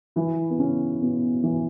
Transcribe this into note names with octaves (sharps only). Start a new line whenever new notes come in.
E3 E4
B3
C#3 C#4
B2 B3
E3